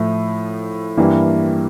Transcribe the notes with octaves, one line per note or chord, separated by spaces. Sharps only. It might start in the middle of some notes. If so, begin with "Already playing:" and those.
Already playing: A2 F3 A3 E4
G2 E3 A#3 E4 G4